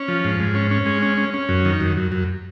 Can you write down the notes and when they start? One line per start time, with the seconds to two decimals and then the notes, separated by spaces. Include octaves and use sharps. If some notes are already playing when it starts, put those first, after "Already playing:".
Already playing: C#4
0.08 F3
0.24 G#2
0.39 G#2
0.55 C#4
0.71 C#4
0.86 G#3
1.02 C#4
1.18 C#4
1.34 C#4
1.49 F#2
1.65 D#3
1.81 F#2
1.97 F#2
2.12 F#2